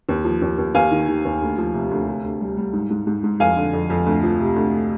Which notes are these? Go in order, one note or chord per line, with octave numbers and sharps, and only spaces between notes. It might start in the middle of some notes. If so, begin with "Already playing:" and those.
D#2
F3
D#2
D#2
D#2 F5 G#5
D#3
D#3
D#2
D2
F3
C3
D2
C3
D2
G3
G3
G#2
G#2
G#2
G#2
F2 F5 G#5
D3
F2
F2
D2
F3
C3
D2